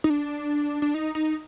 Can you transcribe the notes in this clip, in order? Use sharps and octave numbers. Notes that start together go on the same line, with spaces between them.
D#4
D4
D4
D#4
D#4